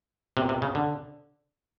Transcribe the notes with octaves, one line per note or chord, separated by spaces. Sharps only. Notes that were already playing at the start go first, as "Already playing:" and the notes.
C3
C3
C#3
D3